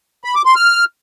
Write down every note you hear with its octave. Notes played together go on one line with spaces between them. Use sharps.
B5
D6
C6
F6